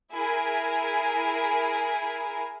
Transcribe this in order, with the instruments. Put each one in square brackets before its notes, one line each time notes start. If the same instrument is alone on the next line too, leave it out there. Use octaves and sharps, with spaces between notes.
[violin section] E4 G#4 A#4